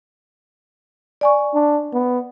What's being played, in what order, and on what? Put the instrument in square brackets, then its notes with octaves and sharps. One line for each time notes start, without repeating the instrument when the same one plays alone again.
[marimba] D5 G#5 C#6
[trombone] D4
B3